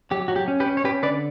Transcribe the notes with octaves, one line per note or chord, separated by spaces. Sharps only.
F#3 G4
F#3 F#4
G4
C#4
G4 B4
C#4
C#5
C#4 G4 B4
D3 B4 D5